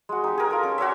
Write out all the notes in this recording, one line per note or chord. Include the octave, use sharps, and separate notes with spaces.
G#3 F#4
D#4 G4
G#4 A#4
F4 A4
C#4
F#4 C#5 D5 E5